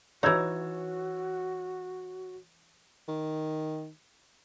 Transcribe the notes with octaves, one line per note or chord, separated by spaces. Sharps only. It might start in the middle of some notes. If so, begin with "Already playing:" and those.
E3 D#4 F#4 C#5 E6 G#6
D#3